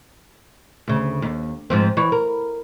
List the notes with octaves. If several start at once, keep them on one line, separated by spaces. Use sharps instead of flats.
D2 C#3
D#2
G#2 F3 C4
E3 C#5
A#4